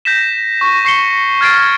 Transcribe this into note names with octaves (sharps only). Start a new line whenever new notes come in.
G6 A#6 B6 E7
C#6 A#6
C#6 C7 C#7 G7
F6 G#6 A6 C7 D7